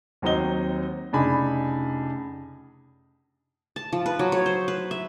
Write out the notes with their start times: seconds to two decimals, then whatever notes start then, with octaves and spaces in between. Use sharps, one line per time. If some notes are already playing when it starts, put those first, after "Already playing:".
0.22 D#2 F#3 C4 D#4 D#5 G7
1.13 F1 C#3 D4 D#4 G#5 B5
3.76 A5
3.93 F3
4.06 B4
4.19 F#3
4.32 C#5
4.46 C5
4.68 B4
4.91 E5